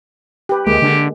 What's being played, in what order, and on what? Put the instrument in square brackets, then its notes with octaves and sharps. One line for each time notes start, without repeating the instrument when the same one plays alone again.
[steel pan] G4 B4
[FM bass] D2 [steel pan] G#3 A#3 [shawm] G4
[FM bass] D3